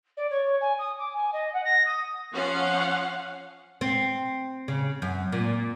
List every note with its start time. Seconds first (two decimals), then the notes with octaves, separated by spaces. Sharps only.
0.17 D5
0.30 C#5
0.61 G#5
0.79 D#6
0.98 D6
1.14 G#5
1.33 D#5
1.53 F#5
1.64 A#6
1.85 D#6
2.33 F3 C#4 F5 F#5
3.81 C4
4.68 C#3
5.02 F#2
5.32 A#2